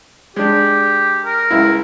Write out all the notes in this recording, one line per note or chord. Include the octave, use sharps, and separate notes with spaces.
G#3 D4 G4
A#4
C#2 E4